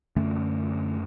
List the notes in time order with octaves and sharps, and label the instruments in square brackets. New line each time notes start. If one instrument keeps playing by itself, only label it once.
[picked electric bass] F#2 D3 A3 C#4